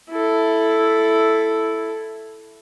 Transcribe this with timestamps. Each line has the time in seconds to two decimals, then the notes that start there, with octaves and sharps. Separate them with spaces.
0.10 E4 A4